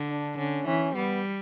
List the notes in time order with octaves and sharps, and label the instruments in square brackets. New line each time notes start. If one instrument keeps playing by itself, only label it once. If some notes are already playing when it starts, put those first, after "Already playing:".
Already playing: [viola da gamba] D3
[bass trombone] D4
[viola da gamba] D3 [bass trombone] C#4
[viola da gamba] E3 [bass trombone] C#4
[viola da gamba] G3 [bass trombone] B3